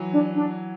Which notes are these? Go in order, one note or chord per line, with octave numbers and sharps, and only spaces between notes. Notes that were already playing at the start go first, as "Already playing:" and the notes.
Already playing: E3 F#3
D4
D4